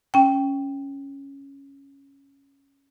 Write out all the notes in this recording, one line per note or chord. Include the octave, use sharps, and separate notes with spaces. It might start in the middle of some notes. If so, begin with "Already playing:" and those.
C#4 G5